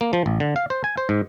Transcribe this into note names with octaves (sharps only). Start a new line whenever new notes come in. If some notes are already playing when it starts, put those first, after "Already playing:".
A#3
F3
A1
D3
F5
C5
G#5
C5
G#2